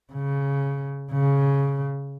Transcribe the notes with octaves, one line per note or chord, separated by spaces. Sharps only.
C#3
C#3